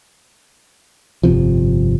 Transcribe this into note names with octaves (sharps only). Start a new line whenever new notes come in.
G1 F2 C3 F3